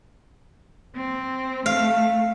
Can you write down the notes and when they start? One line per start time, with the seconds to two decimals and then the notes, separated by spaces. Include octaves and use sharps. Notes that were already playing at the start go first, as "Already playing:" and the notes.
0.95 C4
1.66 A3 F5